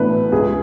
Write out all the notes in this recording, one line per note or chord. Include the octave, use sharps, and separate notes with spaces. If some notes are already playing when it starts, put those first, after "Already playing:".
Already playing: B1 A2 E3 B3 D4 B4
C#2 G#4